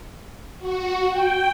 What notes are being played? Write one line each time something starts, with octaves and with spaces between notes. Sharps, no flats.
F#4
G5